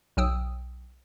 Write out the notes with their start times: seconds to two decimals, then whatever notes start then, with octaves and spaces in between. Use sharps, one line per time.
0.17 B1 F#3 G5 D#6 E6